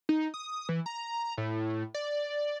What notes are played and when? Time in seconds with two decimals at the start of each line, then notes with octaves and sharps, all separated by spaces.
0.09 D#4
0.34 D#6
0.69 E3
0.86 A#5
1.37 A2
1.94 D5